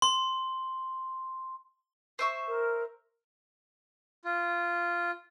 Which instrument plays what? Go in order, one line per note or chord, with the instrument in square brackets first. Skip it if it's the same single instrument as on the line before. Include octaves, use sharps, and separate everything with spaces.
[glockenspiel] C6
[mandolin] C5 E5 C#6
[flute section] A#4
[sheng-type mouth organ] F4